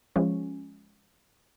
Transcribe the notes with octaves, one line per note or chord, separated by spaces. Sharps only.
F3 G#3 C#4